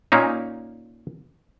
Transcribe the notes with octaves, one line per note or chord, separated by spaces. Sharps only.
A#2 A#3 C#4 D#4